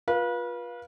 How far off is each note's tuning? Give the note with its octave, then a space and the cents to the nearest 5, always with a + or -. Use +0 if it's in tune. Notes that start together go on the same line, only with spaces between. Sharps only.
F4 +20 B4 -30 F5 +5